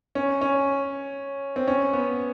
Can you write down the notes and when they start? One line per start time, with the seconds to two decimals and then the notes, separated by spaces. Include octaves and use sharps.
0.15 C#4
0.41 C#4
1.56 C4
1.68 C#4
1.93 B3